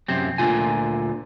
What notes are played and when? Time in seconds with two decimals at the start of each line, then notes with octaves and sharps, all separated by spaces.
0.08 F#2 C3 C4
0.38 D2 A#2 D3 F4 G#5